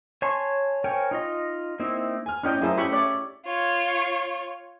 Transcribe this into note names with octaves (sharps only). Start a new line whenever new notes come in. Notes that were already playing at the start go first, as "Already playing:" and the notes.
C#5 G#5 A5 C6 C#6
A#4 C5 C#5 G5 G#5
D#4 F4 D#5
A#3 C4 D#4 E4
G#5 F6
A2 C#4 D4 D#5 G5 F6
F#2 A#3 E4 G#4 C5 E6
A3 C#4 E4 G4 B5 C#6
C#5 D5
F4 C#5